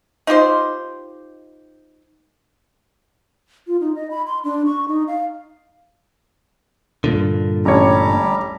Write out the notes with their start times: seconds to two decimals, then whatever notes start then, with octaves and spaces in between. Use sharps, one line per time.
0.27 D#4 F4 G4 C5
3.67 F4
3.81 D#4
3.95 D#5
4.11 B5
4.27 C6
4.44 D4
4.66 C#6
4.88 D#4
5.08 F5
7.04 G2 A#2 D3
7.65 A1 G3 G4 C#5 A#5